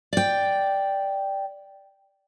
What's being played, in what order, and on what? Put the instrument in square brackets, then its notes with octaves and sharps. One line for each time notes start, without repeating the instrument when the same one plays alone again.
[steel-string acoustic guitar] D5 G5